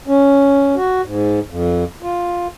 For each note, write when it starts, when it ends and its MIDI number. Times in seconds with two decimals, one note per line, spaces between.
0.08 0.75 61
0.76 1.01 66
1.06 1.40 44
1.50 1.84 41
2.03 2.47 65